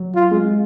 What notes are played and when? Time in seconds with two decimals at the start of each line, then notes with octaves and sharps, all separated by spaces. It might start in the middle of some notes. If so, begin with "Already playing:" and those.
Already playing: F#3
0.15 F4
0.31 G#3